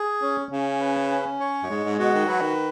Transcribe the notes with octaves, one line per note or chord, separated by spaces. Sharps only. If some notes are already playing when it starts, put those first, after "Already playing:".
Already playing: G#4
C#4
C#3 C#4
B4
C#4
C#5
F#2
G#2 G#3
G#2
B2 F#4
D#3
F#3 B4
D#3